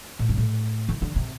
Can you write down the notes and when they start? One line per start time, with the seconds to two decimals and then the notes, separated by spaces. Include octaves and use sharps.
0.19 A2
0.29 G2
0.37 A2
0.89 E3
1.02 D3
1.16 C3